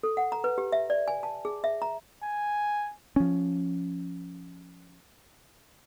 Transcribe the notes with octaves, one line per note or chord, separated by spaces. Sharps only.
A4
F#5
A#5
B4
G4
E5
D5
G#5
A5
G#4
E5
A#5
G#5
F3 C#4